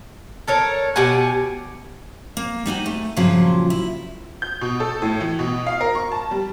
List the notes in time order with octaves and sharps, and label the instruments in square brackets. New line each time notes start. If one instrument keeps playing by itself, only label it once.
[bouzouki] A4 A#4 C#5
B2 G4 F#5 G#5
[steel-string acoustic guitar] A#3
G3 D#4 F#4 G#5
A3
G2 A#2 C#3 F3 F#3 F4
E4
[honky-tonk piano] G6
B2
A4
A2
E3
B2
F5
A#4
C#6
A5
G3